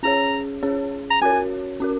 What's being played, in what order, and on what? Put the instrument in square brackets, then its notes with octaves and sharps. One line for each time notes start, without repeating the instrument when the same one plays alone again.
[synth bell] C#4 G#4 C#5 [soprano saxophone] A#5
[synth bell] C#4 G#4 C#5
[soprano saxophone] A#5
[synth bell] C#4 F#4 A#4 C#5 [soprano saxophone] G#5
[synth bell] C#4 F#4 A#4